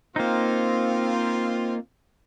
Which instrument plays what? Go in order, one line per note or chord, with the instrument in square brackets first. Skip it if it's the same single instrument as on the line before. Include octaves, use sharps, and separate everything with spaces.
[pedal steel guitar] A#3 D#4 [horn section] C4 F4